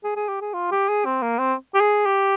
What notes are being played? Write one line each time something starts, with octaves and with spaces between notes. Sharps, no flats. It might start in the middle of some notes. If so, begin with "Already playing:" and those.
G#4
G#4
G4
G#4
F4
G4
G#4
C4
A#3
C4
G4
G#4
G4